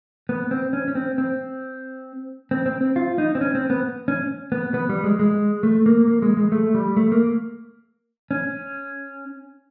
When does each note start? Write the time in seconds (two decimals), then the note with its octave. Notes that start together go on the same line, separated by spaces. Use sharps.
0.29 B3
0.51 C4
0.73 C#4
0.88 C#4
0.95 C4
1.18 C4
2.51 C4
2.66 C4
2.81 C4
2.96 F4
3.18 D#4
3.35 C4
3.41 C#4
3.55 C4
3.70 B3
4.08 C#4
4.52 B3
4.74 B3
4.89 G3
5.04 G#3
5.19 G#3
5.63 A3
5.86 A#3
6.07 A#3
6.22 G#3
6.37 G#3
6.52 A3
6.74 G3
6.97 A3
7.12 A#3
8.31 C#4